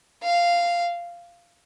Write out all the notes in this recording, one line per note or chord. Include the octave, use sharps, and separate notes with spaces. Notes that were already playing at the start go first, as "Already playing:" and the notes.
F5